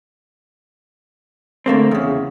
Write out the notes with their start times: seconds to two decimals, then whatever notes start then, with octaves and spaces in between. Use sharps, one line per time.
1.66 D3 A3 A#3 C4
1.91 E2 C#3